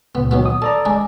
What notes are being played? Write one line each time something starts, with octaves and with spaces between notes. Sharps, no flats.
C#2 A#2 B3
D#3 F#3 B3
D#6
A4 D5 A5 A#5
G#3 D4 G#4